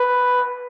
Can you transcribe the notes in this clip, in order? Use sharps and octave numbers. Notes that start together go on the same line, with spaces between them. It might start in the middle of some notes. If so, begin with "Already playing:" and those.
Already playing: B4